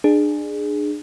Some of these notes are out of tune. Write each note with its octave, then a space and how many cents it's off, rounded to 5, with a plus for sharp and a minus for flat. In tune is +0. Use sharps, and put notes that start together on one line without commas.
D4 +30 G#4 +0